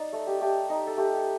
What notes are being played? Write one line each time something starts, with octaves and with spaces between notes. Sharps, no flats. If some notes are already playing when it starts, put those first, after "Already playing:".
Already playing: D#4 D5
A3
G4
A3 G4
D#4
A4
A3 G4